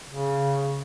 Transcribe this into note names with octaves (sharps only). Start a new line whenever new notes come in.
C#3